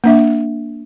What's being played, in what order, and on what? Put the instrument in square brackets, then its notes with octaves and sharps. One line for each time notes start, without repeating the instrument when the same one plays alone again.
[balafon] A#3 D4 E5